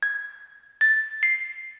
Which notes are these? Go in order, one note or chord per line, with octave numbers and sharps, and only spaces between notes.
G#6
A6
C7